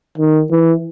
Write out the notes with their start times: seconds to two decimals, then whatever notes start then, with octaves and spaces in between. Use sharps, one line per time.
0.18 D#3
0.51 E3